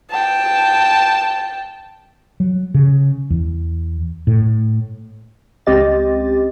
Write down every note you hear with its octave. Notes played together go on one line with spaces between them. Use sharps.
G5 A5
F#3
C#3
E2
A2
C#2 C4 G4 D#5 A6